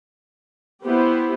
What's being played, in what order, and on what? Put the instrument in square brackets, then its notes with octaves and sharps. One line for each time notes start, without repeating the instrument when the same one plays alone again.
[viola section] B3 E4 G4 C5